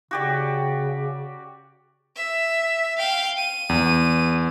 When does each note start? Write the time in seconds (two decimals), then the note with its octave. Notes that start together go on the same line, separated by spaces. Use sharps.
0.11 C#3 F#4 G4 D5
2.16 E5
2.98 F5 G5
3.37 D#7
3.69 E2